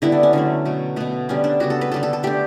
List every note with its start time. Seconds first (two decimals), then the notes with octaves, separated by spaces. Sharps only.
0.02 D3 G3 B3 E4
0.12 D4
0.23 C#4
0.33 D3 F#3 A3
0.65 B2 A3
0.96 B2 A3 B3
1.29 D3 G3 B3 C#4
1.44 D4
1.60 C#3 G3 B3 F#4
1.70 A4
1.81 B4
1.92 D3 G3 B3 A4
2.03 A4
2.13 A4
2.23 D3 A3 G4